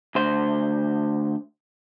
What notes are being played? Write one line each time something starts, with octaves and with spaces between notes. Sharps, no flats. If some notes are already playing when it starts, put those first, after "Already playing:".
D2 C5